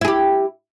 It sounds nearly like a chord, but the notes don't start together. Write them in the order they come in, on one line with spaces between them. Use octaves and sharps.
E4 G#4 G4